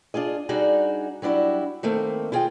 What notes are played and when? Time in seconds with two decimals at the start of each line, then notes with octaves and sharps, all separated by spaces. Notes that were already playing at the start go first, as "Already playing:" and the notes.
0.14 D4 F4 G#4 D#5
0.49 G3 D4 D#4 F#4 G#4
1.22 F#3 G3 D4 E4 F#4
1.83 D#3 A3 A#3 C4
2.32 E4 F4 G#4 D#5 G5